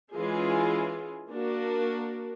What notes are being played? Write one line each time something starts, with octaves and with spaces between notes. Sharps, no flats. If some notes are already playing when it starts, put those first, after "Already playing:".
E3 G#3 C#4 F4 G#4
A#3 D4 F#4 A#4